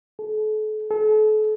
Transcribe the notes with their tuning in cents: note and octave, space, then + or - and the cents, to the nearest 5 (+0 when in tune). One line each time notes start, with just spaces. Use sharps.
A4 -40
A4 -40